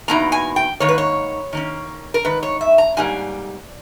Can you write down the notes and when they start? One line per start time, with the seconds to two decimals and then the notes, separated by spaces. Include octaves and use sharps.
0.08 E2 B2 A#3 D#4 A#5
0.32 G#5
0.56 G5
0.80 G#2 D#3 A#3 C#5
0.89 B4
0.98 C#5
1.53 D#3 A#3 C#4
2.14 A#4
2.25 G#2 D#3 B4
2.43 C#5
2.61 E5
2.78 A#5
2.97 G#2 G3 A#3 G#5